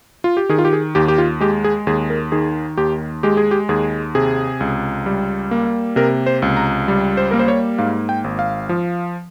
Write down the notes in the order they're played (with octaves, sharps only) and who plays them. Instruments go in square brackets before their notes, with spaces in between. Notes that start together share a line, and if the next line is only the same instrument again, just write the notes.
[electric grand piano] F4
G4
D#3 G#4
F4
G4
G#4
D#2 G4
G4
F4
G#3 G4
G#4
D#2 G#4
A#4
D#3 G#4
D#2 G4
G#3 G4
G#4
G4
D#2 G#4
C3 G#4
C#2
G3
A#3
C3 A#4
C5
C#2
A#5
G3
C5
A#3 A#4
C5
C#5
G#2 F5
G5
G#1
F5
F3